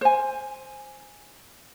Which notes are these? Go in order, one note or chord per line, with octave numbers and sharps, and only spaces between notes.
C5 G#5